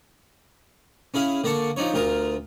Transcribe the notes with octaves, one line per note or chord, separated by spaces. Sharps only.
C#4 E4 G#4 F5
D3 A#3 D4 A5 C#6
F3 D4 D#4 C#5
D2 F4 A#4 D#6